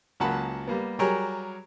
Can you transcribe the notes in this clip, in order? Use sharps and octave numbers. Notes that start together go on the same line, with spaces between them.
C#2 F#3 A#3 F#5 A5 B5
G3 A#3 B3
F#3 G3 G4 G#4 A#4 C#5